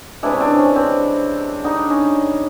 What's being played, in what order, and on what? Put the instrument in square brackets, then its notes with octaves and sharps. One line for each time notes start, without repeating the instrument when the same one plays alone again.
[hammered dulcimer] C3 E3 G#3 D4 E4
C#4
C4 D4
C#4
C4 D4
D3 G3 D#4
D4
C#4 D#4